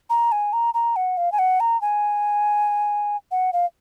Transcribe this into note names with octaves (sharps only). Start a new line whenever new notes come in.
A#5
G#5
A#5
A#5
F#5
F5
G#5
F#5
A#5
G#5
F#5
F5